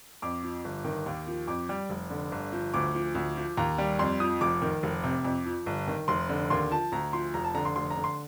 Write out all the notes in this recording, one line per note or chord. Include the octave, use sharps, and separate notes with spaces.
F2 D6
F3
G1
D#3
D#2
F3
F2 D6
G3
F1
D3
G1
F3
D2 D6
F3
D2
F3
D#2 A#5
G3
F2 C6
F3 D#6
F1 D6
D#3
F1
C3
F2
F3
G1
D#3
F1 C6
D3
D#2 C6
F3 A5
D2 A#5
F3 C6
F1 A#5
A5
D3 A#5
C6
F1 C6
A#5
D3
C6